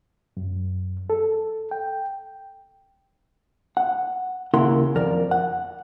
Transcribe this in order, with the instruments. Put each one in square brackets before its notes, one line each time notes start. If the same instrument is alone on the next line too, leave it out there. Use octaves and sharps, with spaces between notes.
[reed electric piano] F#2
A4
G5
[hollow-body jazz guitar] F#5
D#2 C#3 E4 A#4 F#5 C6
F2 A#4 D5
F#5